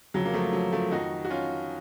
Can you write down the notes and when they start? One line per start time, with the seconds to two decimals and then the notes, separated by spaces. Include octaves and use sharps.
0.14 F2 C#3 F#3
0.25 A#3
0.34 F3 A3
0.53 F#3
0.73 F3 A3
0.91 F2 D#3 D#4 F#4
1.25 F#4
1.30 C#4 F4